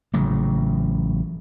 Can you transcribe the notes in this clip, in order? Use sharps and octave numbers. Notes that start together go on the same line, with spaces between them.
A1 C#3 F#3